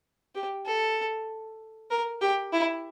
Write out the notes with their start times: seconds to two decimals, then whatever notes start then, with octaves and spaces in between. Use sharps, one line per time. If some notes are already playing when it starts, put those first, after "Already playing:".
0.35 G4
0.66 A4
1.90 A#4
2.21 G4
2.53 E4